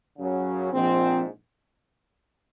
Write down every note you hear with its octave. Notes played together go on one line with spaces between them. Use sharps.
F#2 C#3 F#3
A#1 G#2 F3 C4